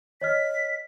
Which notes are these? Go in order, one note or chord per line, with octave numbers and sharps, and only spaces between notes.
C#5 D#5 F6 B6